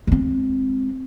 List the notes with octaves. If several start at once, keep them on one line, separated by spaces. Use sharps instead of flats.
G#3 C4